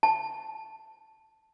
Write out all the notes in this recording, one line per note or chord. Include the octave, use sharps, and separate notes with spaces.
A5